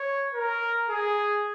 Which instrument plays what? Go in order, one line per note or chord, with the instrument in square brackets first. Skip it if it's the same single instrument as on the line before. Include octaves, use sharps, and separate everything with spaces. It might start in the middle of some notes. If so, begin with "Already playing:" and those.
Already playing: [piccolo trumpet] C#5
A#4
G#4